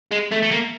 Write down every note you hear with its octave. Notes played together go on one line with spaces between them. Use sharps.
G#3
A3
A3
A#3